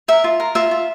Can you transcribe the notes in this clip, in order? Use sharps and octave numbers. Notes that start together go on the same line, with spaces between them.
A#4 E5
F4
A#4
F4 E5
F4